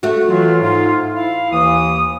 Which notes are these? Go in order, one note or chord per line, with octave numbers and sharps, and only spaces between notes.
A3 F#4
E3 F#3 F4
G#2 F4
E4 F5
D#2 E3 D#6